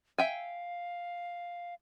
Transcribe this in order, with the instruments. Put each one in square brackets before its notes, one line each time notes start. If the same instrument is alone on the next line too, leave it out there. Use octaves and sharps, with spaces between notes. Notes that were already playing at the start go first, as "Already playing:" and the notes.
[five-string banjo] E5 G5 G#5 [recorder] F5